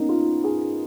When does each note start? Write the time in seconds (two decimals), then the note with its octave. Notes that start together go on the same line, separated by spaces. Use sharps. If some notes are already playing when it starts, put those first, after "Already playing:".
Already playing: A#3 B3 C#4 D#4
0.09 F4
0.44 G#4